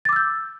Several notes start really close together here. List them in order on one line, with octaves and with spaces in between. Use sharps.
A6 D6 E6 G6